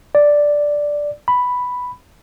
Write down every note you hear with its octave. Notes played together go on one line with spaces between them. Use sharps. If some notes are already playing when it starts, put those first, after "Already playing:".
D5
B5